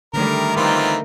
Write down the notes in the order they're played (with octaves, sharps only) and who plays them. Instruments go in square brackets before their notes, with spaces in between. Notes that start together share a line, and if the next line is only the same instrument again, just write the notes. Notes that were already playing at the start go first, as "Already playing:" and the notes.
[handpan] D3 A3 [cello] D#3 G3 [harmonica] A#4
[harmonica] E3 C4 F4 [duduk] D#4 [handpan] A#4